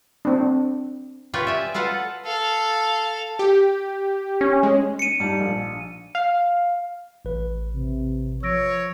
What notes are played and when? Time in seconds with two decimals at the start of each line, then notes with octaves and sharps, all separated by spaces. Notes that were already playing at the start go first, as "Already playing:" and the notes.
0.25 C4 D4
1.34 F4 G4 B4 C#5 D5
1.47 E5 G#5
1.74 F4 A4 B4 F5 F#5
2.25 A4 F5
3.39 G4
4.41 C#4
4.63 G#3
4.99 C#7 D#7
5.20 G#2 G3 A5
5.40 A#1
6.15 F5
7.25 A1 B4
7.73 C3
8.43 F3 C#5 E6 A#6 D7